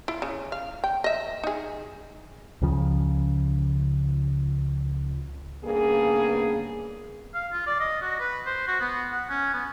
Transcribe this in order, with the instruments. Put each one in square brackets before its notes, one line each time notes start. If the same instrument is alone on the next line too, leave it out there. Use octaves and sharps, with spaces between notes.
[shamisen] E4 F4
C#3
F5
G5
D#5 E5
D#4 G#4
[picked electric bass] C#2 C#3 F3
[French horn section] G2 C#3 A#3 B3 G#4
[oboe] F5
F4
D5
D#5
F#4
B4
C5
F#4
B3
F#5
C#4
B3